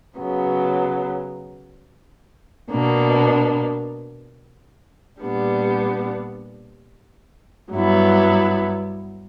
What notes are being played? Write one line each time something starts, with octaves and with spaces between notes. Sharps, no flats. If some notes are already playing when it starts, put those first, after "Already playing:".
C#3 F#3 B3
B2 A#3 D4
A#2 G3 B3 D4
G2 F#3 B3 E4